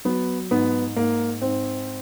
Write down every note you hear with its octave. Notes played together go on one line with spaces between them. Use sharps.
F#3 B3
G#2 B3
G#2 A#3
G#2 C4